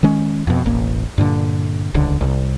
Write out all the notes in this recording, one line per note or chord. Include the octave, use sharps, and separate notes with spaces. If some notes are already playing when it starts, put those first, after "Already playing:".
D#3 G#3 C#4
F2 B2
E1 A1 A#3
G2 A#2 D3
D#1 C#2 D3
C2